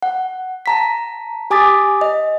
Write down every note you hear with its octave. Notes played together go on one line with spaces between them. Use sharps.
F#5
A5 A#5 B6
G4 G#5 D6 D#6 A6 B6
D#5